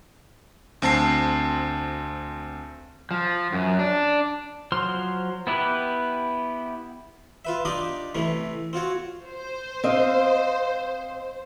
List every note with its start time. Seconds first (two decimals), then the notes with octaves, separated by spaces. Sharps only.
0.82 D2 C4 A5 C7
3.11 F3
3.52 F#2
3.79 D4
4.72 F3 F#3 C5 C6 F6
5.47 B3 E4 G4 B4
7.45 F4 B4 E5
7.65 D4 D#4 F4 G4 D5 D#5
8.15 C3 E3 A3 C#4
8.73 C4 F4 F#4 C#5
9.26 C5
9.84 C4 D#5 F5